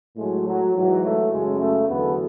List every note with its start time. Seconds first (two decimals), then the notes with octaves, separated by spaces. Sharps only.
0.17 A2 F#3 G#3
0.46 F#3
0.74 G#2 E3 F#3
1.03 A3
1.31 F#2 C#3 F#3 G#3
1.59 A3
1.88 E2 D3 F#3 B3